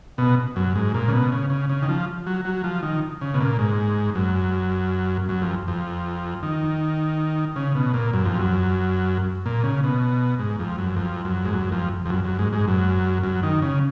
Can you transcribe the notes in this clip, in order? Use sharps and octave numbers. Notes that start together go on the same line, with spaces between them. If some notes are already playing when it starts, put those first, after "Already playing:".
B2
F#2
G#2
A#2
C#3
B2
C#3
C#3
C#3
D#3
F3
F#3
F#3
F3
D#3
C#3
B2
A#2
G#2
F#2
F#2
F2
F2
D#3
C#3
B2
A#2
F#2
F2
F#2
A#2
C#3
B2
G#2
F2
F#2
F2
F#2
G#2
F#2
F2
F2
F#2
F#2
G#2
G#2
F#2
F#2
D#3
C#3